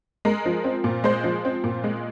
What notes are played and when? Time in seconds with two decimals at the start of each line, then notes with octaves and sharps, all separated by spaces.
0.25 G#3 A#4
0.45 F3
0.64 C4
0.84 A#2
1.04 G#3 C5
1.24 F3
1.45 C4
1.64 A#2
1.84 G#3